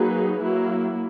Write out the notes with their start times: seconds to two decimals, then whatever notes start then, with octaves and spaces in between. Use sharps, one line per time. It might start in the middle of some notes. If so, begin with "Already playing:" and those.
Already playing: F#3 A#3 D#4 G#4 B4
0.41 F#3 A#3 E4